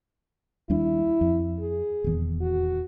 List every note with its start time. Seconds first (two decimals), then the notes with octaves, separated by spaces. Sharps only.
0.70 D#2 G3 D4 E4
1.21 F2
1.59 G#4
2.04 D#1 E2
2.41 F#4